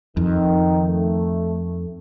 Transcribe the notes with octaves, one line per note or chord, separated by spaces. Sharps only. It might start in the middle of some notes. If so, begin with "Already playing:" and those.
F2 D#3
A3